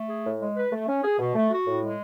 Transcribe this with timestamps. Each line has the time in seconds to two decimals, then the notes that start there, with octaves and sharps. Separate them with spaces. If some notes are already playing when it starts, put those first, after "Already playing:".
Already playing: A3
0.10 G#4
0.25 A2
0.41 G#3
0.57 B4
0.72 A3
0.88 C#4
1.04 G#4
1.19 B2
1.35 A3
1.51 F#4
1.67 A2
1.82 G#3